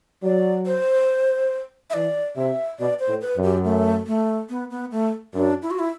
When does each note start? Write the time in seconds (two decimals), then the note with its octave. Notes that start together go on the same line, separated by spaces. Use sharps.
0.23 F#3 D5
0.66 C5
1.90 E5
1.93 E3 D5
2.36 C3 E5
2.79 B2 D5
3.00 C5
3.08 A2
3.22 B4
3.36 F#2
3.43 G4
3.64 A3
4.07 A3
4.50 B3
4.70 B3
4.91 A3
5.34 F#2 D4
5.62 E4
5.71 F#4
5.79 E4